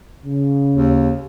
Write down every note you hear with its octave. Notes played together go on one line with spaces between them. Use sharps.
C#3
D#2